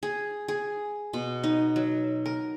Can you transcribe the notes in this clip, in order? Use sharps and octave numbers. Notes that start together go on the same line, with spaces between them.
G#4
G#4
B2
D#4
F#3
A#4